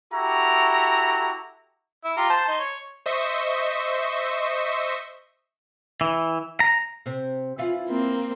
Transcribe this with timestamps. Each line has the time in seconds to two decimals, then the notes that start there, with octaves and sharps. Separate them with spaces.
0.12 E4 F#4 G4 A4 A#5 C#6
2.04 E4
2.17 F4 G4 A#5
2.30 C5 A5
2.48 D#4 C6
2.59 C#5
3.06 C5 D#5 E5 C#6
6.01 E3
6.60 A#5
7.06 C3 C4
7.58 E3 E4 F4
7.89 A#3 C4